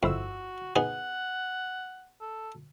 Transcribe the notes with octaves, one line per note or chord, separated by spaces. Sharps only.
G1 F2 E4 F#4 E6
B3 D#4 G#4 F#5
A4